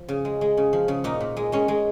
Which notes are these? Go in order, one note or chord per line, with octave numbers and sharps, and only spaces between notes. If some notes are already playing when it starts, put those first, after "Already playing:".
Already playing: F3
C#3
G#3
G#3
C#3
F3
C#3
A#2 D#4
A#2
G#3
G#3 C#4
G#3